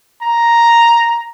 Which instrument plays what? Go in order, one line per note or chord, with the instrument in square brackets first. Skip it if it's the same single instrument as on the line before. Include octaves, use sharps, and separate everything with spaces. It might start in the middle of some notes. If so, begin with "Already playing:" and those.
[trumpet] A#5